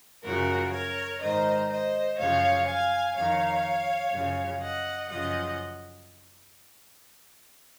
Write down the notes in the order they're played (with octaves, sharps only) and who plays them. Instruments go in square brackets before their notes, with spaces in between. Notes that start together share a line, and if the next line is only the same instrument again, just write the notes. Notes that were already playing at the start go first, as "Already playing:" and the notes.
[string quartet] F#2 C#3 F3 F#4 A#4
A#4 C#5
G#2 D#3 C5 D#5
C5 D#5
F#2 C#3 F3 C#5 F5
F5 G#5
F2 D#3 C#5 F5
F#2 C#3 F3
D#5 F#5
F#2 C#3 F3 D#5 F#5